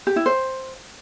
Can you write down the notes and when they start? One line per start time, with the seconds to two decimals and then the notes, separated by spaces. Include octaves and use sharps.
0.07 G4
0.16 E4
0.26 C5